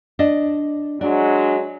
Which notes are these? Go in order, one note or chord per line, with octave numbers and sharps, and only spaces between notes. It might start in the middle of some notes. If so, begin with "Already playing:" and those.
D4 D#5
F#3 G#3 D4